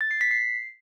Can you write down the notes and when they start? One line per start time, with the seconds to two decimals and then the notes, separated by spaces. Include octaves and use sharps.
0.01 A6
0.11 C7
0.21 B6
0.31 C7